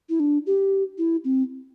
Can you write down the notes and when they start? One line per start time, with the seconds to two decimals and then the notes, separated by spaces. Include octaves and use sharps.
0.09 E4
0.20 D4
0.47 G4
0.98 E4
1.24 C4